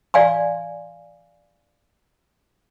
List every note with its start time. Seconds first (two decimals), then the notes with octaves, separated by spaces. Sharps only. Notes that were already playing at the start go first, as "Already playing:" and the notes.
0.14 D5 F5 G#5 C6